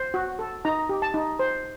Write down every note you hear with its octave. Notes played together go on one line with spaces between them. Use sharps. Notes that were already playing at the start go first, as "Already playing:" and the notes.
Already playing: C5
F#4
A4
D#4 A#5
G4
A5
D#4
C5